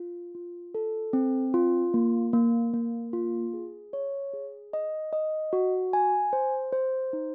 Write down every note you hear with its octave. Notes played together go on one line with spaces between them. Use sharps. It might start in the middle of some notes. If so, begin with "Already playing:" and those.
Already playing: F4
F4
A4
C4
F4
A#3
A#3
A#3
F4
G#4
C#5
G#4
D#5
D#5
F#4
G#5
C5
C5
D#4